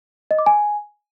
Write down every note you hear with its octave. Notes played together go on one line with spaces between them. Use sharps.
D#5
D6
G#5